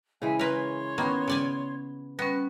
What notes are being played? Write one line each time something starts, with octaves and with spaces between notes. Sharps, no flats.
C#3 E3 G#3 E5 G#5
A#4 B4 C#5 C6
D#3 A#3 B3 C#4 B5 C#6
C#3 D5 G#5
G3 B3 C#4 B4